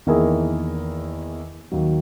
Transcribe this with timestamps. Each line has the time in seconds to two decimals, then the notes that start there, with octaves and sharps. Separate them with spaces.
0.06 E2 D#3 A#3 E4 G#4
1.72 D#2 D#3 F#3